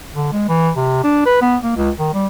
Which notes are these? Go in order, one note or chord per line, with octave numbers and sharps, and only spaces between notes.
D3
G#3
E3
C3
D4
B4
B3
A#3
C#2
D#3
G3